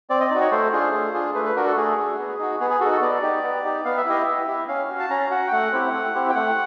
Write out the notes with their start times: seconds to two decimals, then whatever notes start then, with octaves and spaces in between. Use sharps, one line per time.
0.10 C4 D5
0.20 D#5
0.31 D#4 F#4 D5
0.41 C#5
0.51 A3 C5
0.72 D4 F4 G#4
0.93 A3
1.14 D4 F4 G#4
1.35 A3 B4
1.45 B4
1.55 D4 F#4 A#4
1.67 A4
1.77 A3 G#4
1.98 D4 F#4
2.18 B3
2.39 D#4 F#4
2.60 B3 G#4
2.70 G#4
2.80 F#4 A4
2.85 D#4
2.91 A4
3.01 B3 D5
3.22 D#4 G4
3.43 B3
3.64 D#4 G4
3.85 B3 F5
3.97 E5
4.06 E4 G4 D#5
4.22 B3 E5
4.48 E4 G4
4.68 C#4 F5
4.89 F#4
5.00 A5
5.10 C#4 A#5
5.31 F#4 F#5
5.48 G5
5.52 A3 F#5
5.72 C4 E4 G4
5.93 A3
6.14 C4 E4 G4
6.30 G5
6.35 A3 F#5